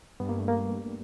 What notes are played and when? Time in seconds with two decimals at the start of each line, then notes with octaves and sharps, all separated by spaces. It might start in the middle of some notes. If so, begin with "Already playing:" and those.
0.20 G2 B3
0.29 A#3
0.39 A3
0.48 A#3